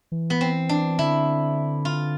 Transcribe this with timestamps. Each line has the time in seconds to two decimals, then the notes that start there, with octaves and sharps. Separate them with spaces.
0.12 E3
0.30 B3
0.41 C4
0.69 D4
0.99 D3 E4
1.85 F4